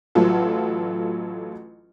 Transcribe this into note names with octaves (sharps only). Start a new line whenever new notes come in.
A1 F#3 F4 A4